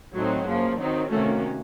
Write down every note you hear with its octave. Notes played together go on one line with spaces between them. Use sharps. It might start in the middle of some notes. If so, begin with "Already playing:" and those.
A2 F#3 A3 C4 D#4
F#2 C#3 F3 A#3
D#3 F#3 C4 D#4
C3 D#3 A3 A#3 C#4 F#4